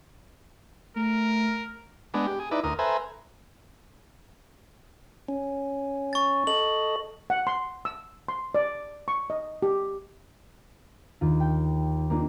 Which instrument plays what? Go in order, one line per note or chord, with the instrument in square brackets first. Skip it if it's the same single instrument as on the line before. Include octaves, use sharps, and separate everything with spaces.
[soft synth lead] A3 [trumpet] A#4
[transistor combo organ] G#3 B3 D4
G4
G#4
D#4 E4 B4 D5
D2 A#4 D#6
A4 B4 C5 E5 G#5 A#5
[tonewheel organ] C#4
[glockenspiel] C#6 A6
[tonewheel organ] A4 D#5 [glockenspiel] F#7
[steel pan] F#5
C6
E6
C6
D5
C#6
D#5
G4
[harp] D#2 F4
G5
A#3 C4 D4 D#4 F4